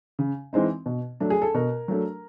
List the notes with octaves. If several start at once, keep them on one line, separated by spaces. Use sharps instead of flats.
C#3
E3 G#3 C4 D#4
B2
F#3 A3 D4
G#4
A4
B2 A#4
F#3 A3 D4